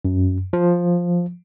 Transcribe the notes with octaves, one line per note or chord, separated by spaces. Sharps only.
F#2
F3